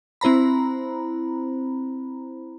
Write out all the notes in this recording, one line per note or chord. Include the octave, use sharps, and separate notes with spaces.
C4 E4 C5 A#5 B5